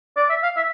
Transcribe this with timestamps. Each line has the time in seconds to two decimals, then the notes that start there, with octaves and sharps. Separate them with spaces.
0.17 D5
0.30 E5
0.43 F5
0.57 E5